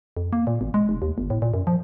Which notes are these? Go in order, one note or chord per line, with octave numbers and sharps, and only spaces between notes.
F2
A#3
A#2
G#1
G#3
F1
D#2
G1
A2
A#2
F#2
F3